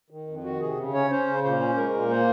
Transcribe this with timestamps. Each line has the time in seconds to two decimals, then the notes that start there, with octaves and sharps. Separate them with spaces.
0.10 D#3
0.28 F2
0.44 D#3 F#4
0.61 C3 G#4
0.77 C#3
0.94 C#4 C#5
1.10 C#4 C5
1.27 C#3
1.43 A#2 C5
1.60 C#4
1.77 G#3 A#4
1.94 A#2
2.10 A#3 C5